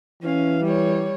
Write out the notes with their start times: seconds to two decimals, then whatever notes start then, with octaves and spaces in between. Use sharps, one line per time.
0.23 E3 C#4 F5
0.64 G3 C#5